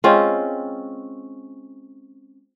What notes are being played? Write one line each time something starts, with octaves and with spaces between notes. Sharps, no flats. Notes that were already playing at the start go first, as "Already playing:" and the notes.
G#3 C4 C#4 F4